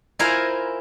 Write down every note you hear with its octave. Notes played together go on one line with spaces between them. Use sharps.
E4 F4 A#4 C5 G#5 A#5